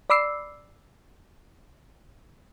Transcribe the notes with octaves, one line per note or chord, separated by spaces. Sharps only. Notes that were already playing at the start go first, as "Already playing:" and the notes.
D5 B5 D6 E6 C7